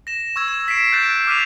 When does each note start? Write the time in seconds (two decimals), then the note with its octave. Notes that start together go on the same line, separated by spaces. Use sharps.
0.07 A#6 E7
0.36 C#6 E6 G#6
0.48 E7
0.68 B6 C7 D7 E7
0.92 F#6 G6 A6 D7
1.27 D6 F6 B6 D#7 F7